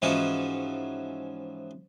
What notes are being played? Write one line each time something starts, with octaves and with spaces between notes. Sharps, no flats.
G#2 E3 F3 C#4 F#4